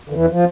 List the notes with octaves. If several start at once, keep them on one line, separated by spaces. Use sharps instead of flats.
D3
E2 E3
F3